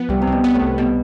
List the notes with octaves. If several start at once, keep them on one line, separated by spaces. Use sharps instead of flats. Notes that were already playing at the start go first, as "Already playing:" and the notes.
Already playing: F3 B3
C2 G3
C3
C2
B2
B3
A2
C2
B2 G3